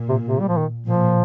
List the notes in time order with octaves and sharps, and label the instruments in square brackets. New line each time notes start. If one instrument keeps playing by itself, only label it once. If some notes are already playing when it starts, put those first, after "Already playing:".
Already playing: [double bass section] A#2
[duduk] C3
C3
G3
F3
D#3
[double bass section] A#2 [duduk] F3